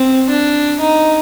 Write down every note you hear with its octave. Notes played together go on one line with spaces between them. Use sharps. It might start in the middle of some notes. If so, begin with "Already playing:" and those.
Already playing: C4
D4
D#4